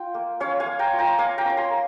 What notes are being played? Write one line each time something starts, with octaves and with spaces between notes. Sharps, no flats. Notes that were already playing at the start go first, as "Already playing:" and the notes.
Already playing: F4 G5
A#3
C#4 C#5 F5
F5 G#5
A#3
G5 A#5
F4
G5 A#5
A#3 F5 G#5
G5 A#5
C#4
A#5
G#5 C6
A#3